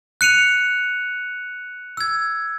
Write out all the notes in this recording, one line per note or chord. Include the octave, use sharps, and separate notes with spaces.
F#6 C#7 D#7 F7
E6 G#6